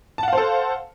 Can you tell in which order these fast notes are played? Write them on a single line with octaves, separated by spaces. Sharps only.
A5 F#5 F5 C5 A4